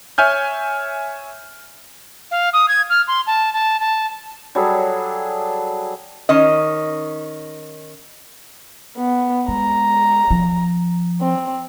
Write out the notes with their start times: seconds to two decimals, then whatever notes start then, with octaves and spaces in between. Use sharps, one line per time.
0.18 C#5 E5 G#5 F6 G6
2.31 F5
2.53 D#6
2.68 G#6
2.90 F6
3.08 C6
3.27 A5
3.53 A5
3.80 A5
4.55 F#3 G3 G#4 A4
6.29 D#3 C#4 D#5
8.97 B3
9.48 G#3 A#5
10.31 F3
11.21 C4